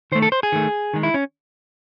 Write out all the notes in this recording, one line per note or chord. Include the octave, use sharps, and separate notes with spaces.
D#3 A3 C5
A4
C5
G#4
D#3 A3
D#3 G#3
E4
C#4